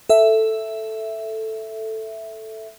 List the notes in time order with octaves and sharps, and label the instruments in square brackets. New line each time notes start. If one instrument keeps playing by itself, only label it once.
[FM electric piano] A4 E5